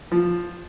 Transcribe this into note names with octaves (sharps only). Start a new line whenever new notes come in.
F3